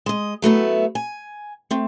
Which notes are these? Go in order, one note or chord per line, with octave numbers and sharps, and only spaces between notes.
G#3 D#5
F#3 A3 B3 E4
G#5
A3 C4